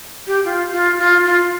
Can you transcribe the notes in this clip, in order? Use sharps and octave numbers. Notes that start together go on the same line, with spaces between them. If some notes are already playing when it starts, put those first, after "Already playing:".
G4
F4
F4
F4
F4